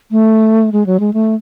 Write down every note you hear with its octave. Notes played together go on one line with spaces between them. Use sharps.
A3
G#3
F#3
G#3
A3